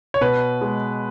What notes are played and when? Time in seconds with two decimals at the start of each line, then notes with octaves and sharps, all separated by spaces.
0.14 C#5
0.21 B2 B4
0.61 G#3